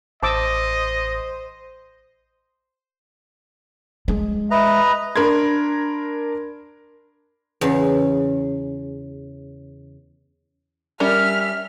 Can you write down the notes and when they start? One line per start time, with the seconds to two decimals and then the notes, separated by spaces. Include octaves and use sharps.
0.23 A1 C5 D#5 A5 D6 E6
4.08 G#3
4.51 B4 D#5 E5 A#5
5.16 D4 A#4 B5 C6 G#6
7.61 E2 C#3
11.00 G3 C#4 A#4 E5 F6